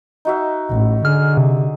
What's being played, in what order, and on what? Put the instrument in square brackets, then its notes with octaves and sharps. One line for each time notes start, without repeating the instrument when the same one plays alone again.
[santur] D#4 F#4 E5
[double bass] A1
[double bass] D3 [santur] G#4 [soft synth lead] F6
[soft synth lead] C3